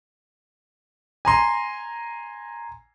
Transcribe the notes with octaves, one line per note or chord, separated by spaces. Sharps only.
G#5 A#5 C6